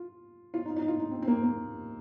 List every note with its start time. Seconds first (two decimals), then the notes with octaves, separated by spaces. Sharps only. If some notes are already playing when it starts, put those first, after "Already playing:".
Already playing: F4
0.54 F4
0.65 D#4
0.76 D#4
0.88 F4
1.00 D#4
1.11 C4
1.22 C4
1.28 A#3
1.43 A#3